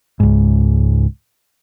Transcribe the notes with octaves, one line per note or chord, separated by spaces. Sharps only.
C#2 G#2